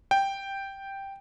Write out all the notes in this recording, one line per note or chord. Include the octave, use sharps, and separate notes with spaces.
G5